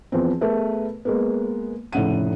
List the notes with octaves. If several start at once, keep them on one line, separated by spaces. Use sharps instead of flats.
E2 F3 B3 C4
A3 B3 G#4 A#4 B4 E5
G#3 A#3 B3
F1 A2 C#3 F#5 D#7